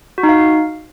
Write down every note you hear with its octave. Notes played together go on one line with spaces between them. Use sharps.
F#4
D#4
F5